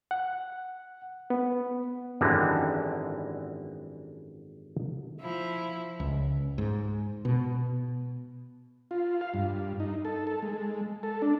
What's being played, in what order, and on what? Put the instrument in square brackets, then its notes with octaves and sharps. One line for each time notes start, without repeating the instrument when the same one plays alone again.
[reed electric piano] F#5
B3
[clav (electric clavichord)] G#1 F#2 D3 E3 G3 G#3
[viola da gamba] F3 E4
[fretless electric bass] C#2
G#2
B2
[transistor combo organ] F4
F5
G2
D#4
A4
A4
G#3
A4
D4